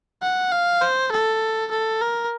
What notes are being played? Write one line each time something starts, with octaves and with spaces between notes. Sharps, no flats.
F#5
F5
C5
A4
A4
A#4